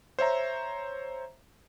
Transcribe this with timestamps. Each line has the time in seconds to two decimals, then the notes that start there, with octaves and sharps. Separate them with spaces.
0.19 C5 C#5 E5 A#5